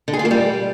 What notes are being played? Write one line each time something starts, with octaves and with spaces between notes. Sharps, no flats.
D3
G#4
F4
A#3
G3